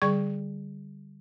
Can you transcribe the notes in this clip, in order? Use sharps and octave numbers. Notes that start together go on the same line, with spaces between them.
D3 G3 G#4 D5 C#6 G#6